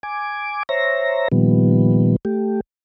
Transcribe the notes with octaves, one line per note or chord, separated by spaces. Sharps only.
G#5 D6
C5 C#5 E5 A#5 A#6
A#2 D#3 F3 G3 B3
A3 G4